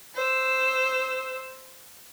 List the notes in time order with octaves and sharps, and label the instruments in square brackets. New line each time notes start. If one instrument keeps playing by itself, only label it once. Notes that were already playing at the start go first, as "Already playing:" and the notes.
[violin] C5 E6